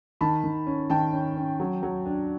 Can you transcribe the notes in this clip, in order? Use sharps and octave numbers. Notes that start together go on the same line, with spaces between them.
D#3 A5 B5
D#3
C#4
D#3 G5 A5
C#4
C#4
F#3
F#3
D4